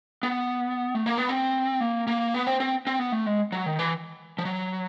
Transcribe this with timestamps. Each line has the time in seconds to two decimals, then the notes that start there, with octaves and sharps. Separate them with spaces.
0.23 B3
0.95 A3
1.06 A#3
1.18 B3
1.29 C4
1.81 A#3
2.07 A#3
2.34 B3
2.47 C4
2.60 C4
2.87 C4
2.99 B3
3.12 A3
3.26 G#3
3.52 F#3
3.66 D#3
3.79 E3
4.38 F3
4.45 F#3